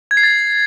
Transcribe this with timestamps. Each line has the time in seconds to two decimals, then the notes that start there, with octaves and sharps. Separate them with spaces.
0.11 G#6
0.17 C7
0.23 A6